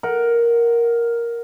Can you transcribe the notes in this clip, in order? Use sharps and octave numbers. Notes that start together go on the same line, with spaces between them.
A#4 F#5